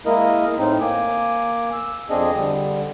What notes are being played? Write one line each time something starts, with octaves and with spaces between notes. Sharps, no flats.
G#3 A#3 E4 A#4 D#5
A2 C4 D#4
A#3 G#5 D6
E6
F2 C4 D4 G#4 D#5
D3 G3